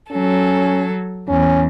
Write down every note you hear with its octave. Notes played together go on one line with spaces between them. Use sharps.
F#3 C#4 A4
E2 C#4